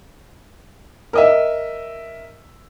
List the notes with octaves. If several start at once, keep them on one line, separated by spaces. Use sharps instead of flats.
A#4 D#5 E5